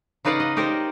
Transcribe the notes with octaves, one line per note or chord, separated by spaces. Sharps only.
C#3 D#4 B4 D5 F5 F#5
D#5
D#4 G4 A#4 C5 D5 D#5